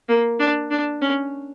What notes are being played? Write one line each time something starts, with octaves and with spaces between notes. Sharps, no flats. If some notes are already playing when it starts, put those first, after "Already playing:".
A#3
D4
D4
C#4